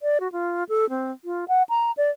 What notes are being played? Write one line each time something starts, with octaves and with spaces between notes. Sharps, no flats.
D5
F#4
F4
A4
C4
F4
F#5
A#5
D5